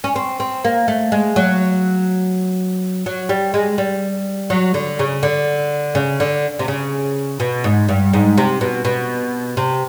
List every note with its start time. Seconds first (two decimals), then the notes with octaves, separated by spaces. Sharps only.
0.04 C#4
0.16 C4
0.40 C4
0.65 A#3
0.88 A3
1.12 G#3
1.36 F#3
3.06 F#3
3.29 G3
3.54 G#3
3.78 G3
4.50 F#3
4.74 D3
4.99 C#3
5.23 D3
5.95 C#3
6.20 D3
6.59 C3
6.68 C#3
7.40 B2
7.64 G#2
7.89 G2
8.13 G#2
8.38 C3
8.61 B2
8.85 B2
9.57 C3